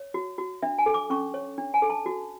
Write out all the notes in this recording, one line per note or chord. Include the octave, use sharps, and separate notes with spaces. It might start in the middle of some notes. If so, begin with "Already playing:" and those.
Already playing: C#5
F#4
F#4
D4 E5
G#5
A4
D6
C#4 C#6
C#5
D4
G#5
A4
A5
F#4